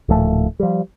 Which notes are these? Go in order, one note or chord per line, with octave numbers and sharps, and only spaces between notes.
D1 A#2 F3 A3
F3 G3